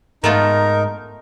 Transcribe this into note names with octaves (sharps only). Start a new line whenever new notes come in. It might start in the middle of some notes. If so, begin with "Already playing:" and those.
G#2 A3 B3 D#4 F4 A#4